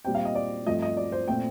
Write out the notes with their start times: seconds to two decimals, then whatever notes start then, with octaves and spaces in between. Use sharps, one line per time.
0.05 A#2 G3 C4 G5
0.15 F5
0.25 D#5
0.35 D5
0.67 G2 F3 A3 C4 D#5
0.82 D#5
0.97 D5
1.12 C5
1.28 A#2 A3 C4 G5